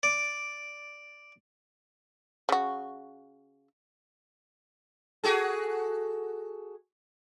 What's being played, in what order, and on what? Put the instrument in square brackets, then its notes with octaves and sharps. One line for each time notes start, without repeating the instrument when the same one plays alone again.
[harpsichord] D5
[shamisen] C#3 F#4
[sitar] F#4 G#4 A4